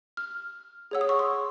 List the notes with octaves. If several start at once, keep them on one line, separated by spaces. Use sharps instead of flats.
F6
G#4 C#5 F#5 E6
D#6
C#6
C6